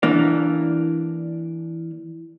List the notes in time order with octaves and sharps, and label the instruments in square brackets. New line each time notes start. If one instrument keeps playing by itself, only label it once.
[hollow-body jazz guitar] E3 A#3 D4